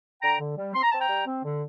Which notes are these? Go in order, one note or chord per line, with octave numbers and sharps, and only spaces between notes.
D3 G5 A#5
D3
G3
C4 C6
A#5
C4 A5
G5 A#5
G3
C4
D3